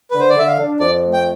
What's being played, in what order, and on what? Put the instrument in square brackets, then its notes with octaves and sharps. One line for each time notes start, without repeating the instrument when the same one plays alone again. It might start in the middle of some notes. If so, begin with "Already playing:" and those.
[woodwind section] D3 [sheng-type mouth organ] B4
[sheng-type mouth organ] C5
D5
[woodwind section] D3 [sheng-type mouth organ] E5
[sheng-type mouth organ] F5
[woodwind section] D4
[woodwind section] F2 [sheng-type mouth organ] D5
[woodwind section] A3
[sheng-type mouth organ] G5